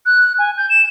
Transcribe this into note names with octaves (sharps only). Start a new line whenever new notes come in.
F#6
G#5
G6
E7